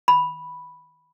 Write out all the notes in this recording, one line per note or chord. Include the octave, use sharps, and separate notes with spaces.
B5